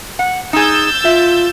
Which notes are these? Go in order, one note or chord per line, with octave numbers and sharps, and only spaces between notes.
F#5
D#4 G#4 E6 G6 A6
F4 E5